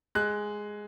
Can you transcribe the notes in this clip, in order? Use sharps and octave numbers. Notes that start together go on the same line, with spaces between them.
G#3 F#6